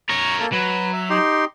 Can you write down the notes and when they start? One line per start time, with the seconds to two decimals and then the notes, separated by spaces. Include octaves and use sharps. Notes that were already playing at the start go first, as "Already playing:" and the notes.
0.09 A#4 C#5 C#6
0.40 A#3 A4
0.52 F#3 B4
0.93 E5
1.10 D#4 G4 C6